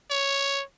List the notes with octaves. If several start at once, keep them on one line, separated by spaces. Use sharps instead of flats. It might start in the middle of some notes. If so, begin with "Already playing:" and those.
C#5